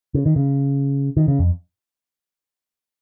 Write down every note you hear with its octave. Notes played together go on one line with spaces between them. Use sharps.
C#3
D#3
C#3
D#3
C#3
F2